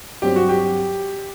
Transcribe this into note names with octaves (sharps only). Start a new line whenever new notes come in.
G2 F#3 C4 G4
F#4
G4